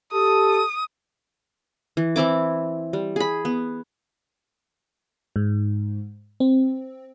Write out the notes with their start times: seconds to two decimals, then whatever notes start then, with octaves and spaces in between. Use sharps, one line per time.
0.12 G4 A4 D#6
1.97 E3
2.16 E3 C4 E4 D6
2.93 G3
3.16 G#4 B5
3.45 B3
5.36 G#2
6.40 C4